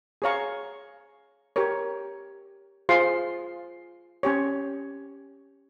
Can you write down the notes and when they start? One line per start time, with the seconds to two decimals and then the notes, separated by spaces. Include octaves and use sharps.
0.22 G#4 C#5 F5 A#5 C#6
1.56 G4 A#4 C#5
2.89 F4 G#4 C5 F5 C6
4.23 C#4 G4 C#5